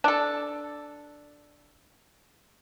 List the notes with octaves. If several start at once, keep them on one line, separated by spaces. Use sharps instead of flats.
D4 A4